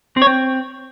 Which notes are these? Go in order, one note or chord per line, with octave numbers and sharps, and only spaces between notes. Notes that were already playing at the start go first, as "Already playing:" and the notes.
C4
C#5
C4